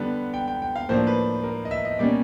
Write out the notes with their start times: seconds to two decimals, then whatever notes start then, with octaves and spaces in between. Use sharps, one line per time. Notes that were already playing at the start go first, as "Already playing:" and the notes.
Already playing: D3 G3 B3
0.34 G5
0.48 G5
0.62 G5
0.76 F5
0.89 A2 F3 A#3 D4 C5
1.07 B4
1.44 A#4
1.65 D#5
1.71 E5
1.85 D#5
1.99 B2 G3 A#3 C#4 D5